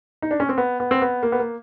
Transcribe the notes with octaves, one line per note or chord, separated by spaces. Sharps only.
D#4
D4
C#4
C4
B3
B3
C4
B3
A#3
B3
A#3